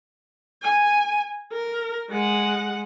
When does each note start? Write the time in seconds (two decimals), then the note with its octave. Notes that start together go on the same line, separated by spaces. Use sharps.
0.62 G#5
1.52 A#4
2.10 G#3 F#5